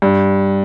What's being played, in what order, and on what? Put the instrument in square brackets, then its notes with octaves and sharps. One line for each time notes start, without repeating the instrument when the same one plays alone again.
[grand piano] G2